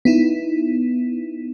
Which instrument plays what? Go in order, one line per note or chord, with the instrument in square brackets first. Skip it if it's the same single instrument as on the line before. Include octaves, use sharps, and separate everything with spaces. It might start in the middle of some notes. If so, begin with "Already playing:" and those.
[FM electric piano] B3 D#4 E4